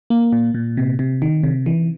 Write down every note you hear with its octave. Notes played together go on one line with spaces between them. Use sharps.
A#3
A#2
A#2
C3
C3
D#3
C3
E3